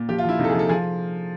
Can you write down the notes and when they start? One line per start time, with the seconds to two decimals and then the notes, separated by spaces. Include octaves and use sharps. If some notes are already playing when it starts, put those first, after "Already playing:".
Already playing: A#2
0.08 F3 G4
0.18 F4
0.24 F3 E4
0.39 C3 D#4
0.44 A4
0.49 G#4
0.54 F3 A4
0.69 F3 G#4